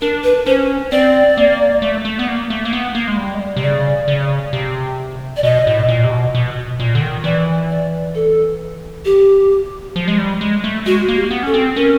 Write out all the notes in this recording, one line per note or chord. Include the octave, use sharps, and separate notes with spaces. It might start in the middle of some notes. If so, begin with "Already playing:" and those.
D4 A#4
B4
C#4 C5
C4 D5
A#3
A3
A3
B3
A#3
A3
A#3
B3
A#3
G#3
G3
G#3
G3
C3
C#3 D5
C#3
C3
D5
B2 D#5
A2
A#2
C3
B2
B2
A#2
D3
D#3
E3 D5
D5
A4
G4
F3
G#3
G3
G#3
A3
G#3 F#4
A#3
G4
B3
C#4 A4
C4
C#4 A#4